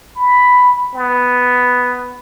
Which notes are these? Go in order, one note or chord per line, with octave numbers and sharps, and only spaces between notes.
B5
B3